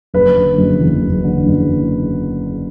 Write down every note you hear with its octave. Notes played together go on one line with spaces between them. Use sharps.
F#1 B4
D3
F#1
E2
F#1
D3
F#1